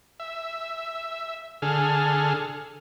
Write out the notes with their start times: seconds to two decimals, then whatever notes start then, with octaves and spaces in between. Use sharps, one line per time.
0.20 E5
1.62 D3 G#4 A4 F6